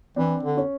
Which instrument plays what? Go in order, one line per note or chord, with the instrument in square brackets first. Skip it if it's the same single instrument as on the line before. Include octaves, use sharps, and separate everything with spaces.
[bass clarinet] E3 [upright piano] C4 D4
[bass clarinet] D3
[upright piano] C#4